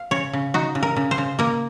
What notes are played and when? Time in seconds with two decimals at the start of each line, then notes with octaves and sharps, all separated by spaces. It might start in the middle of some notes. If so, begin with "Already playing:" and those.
Already playing: F5
0.11 C#3 C#5
0.33 C#3
0.54 D#4 F#4
0.75 C#3
0.83 A#4
0.96 C#3
1.11 C5
1.18 C#3
1.39 A#3 A#4